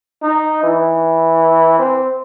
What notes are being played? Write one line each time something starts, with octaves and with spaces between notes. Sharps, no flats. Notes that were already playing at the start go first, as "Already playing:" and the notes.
D#4
E3
C4